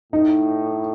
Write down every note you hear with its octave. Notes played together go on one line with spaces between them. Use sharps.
A2 D#4